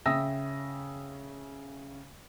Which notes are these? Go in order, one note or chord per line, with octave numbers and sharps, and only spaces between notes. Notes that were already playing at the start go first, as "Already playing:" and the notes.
C#3 E5 G5 D#6 E6 A#6